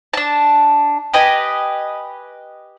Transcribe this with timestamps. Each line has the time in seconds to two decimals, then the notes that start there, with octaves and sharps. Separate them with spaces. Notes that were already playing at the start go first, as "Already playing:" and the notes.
0.13 D4 A5
1.14 G4 B4 D#5 G#5